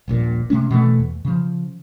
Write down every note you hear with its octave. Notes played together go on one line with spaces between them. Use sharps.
D#1 A#1 A#2
C3 D#3 A3 C#4
B2 E3 A3
E2
C#3 F3